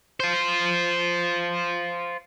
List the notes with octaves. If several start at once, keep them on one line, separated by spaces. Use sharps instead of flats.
F4 C5